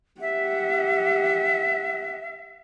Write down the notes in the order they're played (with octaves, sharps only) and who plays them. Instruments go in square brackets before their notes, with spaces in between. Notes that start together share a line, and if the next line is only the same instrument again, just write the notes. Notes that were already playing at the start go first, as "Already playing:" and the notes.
[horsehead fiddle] G4 F#5 [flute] E5